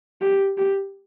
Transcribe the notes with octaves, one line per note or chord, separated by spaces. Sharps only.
G4
G4